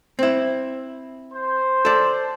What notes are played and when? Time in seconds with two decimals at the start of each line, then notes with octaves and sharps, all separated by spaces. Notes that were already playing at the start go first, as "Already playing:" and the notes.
0.19 C4 E4
1.33 C5
1.85 A4 D5